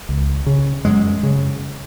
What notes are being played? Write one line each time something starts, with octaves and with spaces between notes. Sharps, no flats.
C#2
C#3
F#2 G#3
C#3